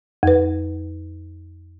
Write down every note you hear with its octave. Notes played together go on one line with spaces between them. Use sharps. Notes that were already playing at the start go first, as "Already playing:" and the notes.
F2 B4